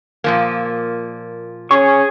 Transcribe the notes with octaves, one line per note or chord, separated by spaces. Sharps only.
A#2 F3 A#3
C#4 G#4 C#6